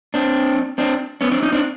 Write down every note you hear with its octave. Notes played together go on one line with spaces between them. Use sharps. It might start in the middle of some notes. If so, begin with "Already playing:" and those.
C4 D4
C4 D4
B3 C#4
C4 D4
C#4 D#4
C4 D4